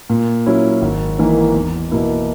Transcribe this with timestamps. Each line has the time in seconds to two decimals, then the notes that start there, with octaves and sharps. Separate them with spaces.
0.10 A#2
0.46 F#3 C#4 E4
0.82 G#1
1.19 G#2 E3 A#3
1.54 E2
1.91 B2 A#3 E4